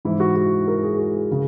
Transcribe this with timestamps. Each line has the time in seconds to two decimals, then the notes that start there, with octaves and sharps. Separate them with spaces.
0.05 G#2 E3 E4
0.20 F#4
0.36 F#4
0.67 A#4
0.83 G#4
0.98 F#4
1.14 G#4
1.31 C#3